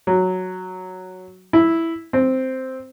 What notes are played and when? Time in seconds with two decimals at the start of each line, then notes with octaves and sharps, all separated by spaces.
0.07 F#3
1.53 E4
2.13 C4